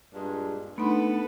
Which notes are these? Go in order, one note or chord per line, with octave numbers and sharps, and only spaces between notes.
G2 A#2 G#3
A3 B3 D4 D#4 A4 B4 B5